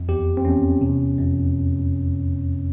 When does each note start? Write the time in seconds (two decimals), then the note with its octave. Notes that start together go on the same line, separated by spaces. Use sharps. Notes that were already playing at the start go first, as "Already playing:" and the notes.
Already playing: F2
0.09 E2 G4
0.37 C4
0.45 E2 C#4
0.81 C3
1.18 F2